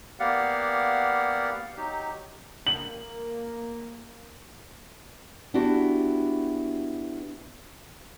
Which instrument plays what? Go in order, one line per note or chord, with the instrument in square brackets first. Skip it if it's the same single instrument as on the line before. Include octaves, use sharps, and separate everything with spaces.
[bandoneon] A#3 B3 G4 D5 F5 F#5
F#3 D#4 G4
[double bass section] A#3 [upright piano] F#7
[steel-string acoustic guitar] B3 D4 E4 F#4 G4